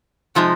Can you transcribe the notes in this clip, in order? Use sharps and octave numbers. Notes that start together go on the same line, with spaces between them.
C3 F3 G#3 D#4